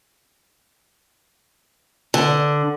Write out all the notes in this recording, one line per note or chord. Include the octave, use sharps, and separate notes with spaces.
D3